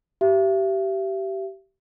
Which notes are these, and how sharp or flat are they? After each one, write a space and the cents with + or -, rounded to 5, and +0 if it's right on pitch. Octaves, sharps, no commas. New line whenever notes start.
G4 -20 E5 +35